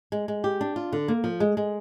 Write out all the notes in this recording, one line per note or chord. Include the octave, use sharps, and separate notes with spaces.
G#3
G#3
G4
D4
F4
D3
A#3
F3
G#3
G#3